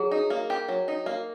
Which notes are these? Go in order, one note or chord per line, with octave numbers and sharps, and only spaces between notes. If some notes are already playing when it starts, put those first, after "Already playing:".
Already playing: F#3 G#4
D#4
A#3
G4
F#3
D#4
A#3